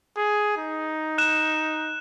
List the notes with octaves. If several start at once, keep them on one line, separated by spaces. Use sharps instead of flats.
G#4
D#4
F#6 E7